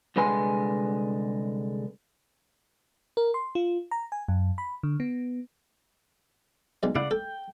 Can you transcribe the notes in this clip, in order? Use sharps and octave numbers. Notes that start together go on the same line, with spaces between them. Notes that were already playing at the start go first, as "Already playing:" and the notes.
C2 D3 G#3 B4 G#5 C6
A#4
C6
F4
A#5
G#5
F#2
B5
D3
B3
B1 G#3 D5
C#3 E4 D5 F#5
A4 G5